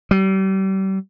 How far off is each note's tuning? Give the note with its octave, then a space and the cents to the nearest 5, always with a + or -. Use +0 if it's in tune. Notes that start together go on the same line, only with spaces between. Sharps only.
G3 -35